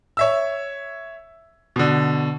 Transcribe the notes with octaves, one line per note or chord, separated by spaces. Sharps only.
C#5 E5 E6
B2 D3